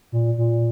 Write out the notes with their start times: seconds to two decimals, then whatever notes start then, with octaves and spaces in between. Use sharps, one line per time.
0.12 A#2
0.38 A#2